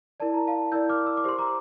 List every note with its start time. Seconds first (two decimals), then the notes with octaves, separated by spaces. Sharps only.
0.20 E4 A#4 D5 A5
0.34 A#5
0.47 F5 A5
0.72 E4 A#4 D5 E6 G6
0.89 D6 F6
1.07 E6
1.17 D6
1.24 G4 C5 C6
1.38 A#5 D6